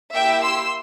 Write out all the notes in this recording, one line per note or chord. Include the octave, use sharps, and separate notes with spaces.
A#3 E4 G4 E5 G5
C6 E6